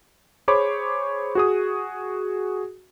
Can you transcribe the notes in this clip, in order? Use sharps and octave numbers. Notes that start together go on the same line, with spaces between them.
G#4 C5 C#5 B5 C#6 D6
F#4 G#4 D#6